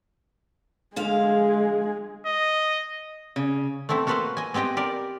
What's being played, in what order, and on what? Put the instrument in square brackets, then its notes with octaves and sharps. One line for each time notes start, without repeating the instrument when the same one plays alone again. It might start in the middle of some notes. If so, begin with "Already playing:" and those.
[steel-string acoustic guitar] D3 F3 F5 [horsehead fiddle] G#3 G#4
[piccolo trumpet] D#5
[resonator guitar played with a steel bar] C#3
[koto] A3 B3 C4 E4 A4
A#3 F#4 A4 B4 C5 F5
D#5 G#5
B3 C4 G4 D#5 G5
G4 A#4 D5